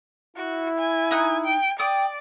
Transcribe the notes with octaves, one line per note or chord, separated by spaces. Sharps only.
E4 F#4
G#5
D#4 D#6 F#6
G5
D5 G5 D#6